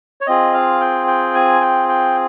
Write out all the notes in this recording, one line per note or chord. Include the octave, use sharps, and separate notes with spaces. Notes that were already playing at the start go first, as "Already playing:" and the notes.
C#5
C4 F4 G#4 D#5
F5
G5
G5
G#5
G5
G5